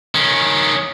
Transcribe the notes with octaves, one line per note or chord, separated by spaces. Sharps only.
D#3 C#4